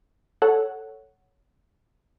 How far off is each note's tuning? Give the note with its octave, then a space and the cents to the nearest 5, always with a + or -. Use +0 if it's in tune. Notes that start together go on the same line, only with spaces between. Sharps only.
A4 +0 C#5 +0 F#5 +0